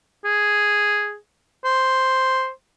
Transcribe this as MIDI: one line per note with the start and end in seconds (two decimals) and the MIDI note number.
0.25 1.16 68
1.65 2.50 72